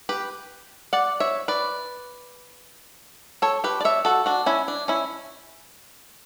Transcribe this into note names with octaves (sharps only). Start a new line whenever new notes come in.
G4 B4
D5 F#5
C#5 E5
B4 D5
A4 C#5
G4 B4
D5
C#5 E5
F#4 A4
D4 F#4
C#4 E4
D4
C#4 E4